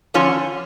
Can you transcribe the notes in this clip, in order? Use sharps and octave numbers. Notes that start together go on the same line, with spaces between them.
D3 F3 C#4 F4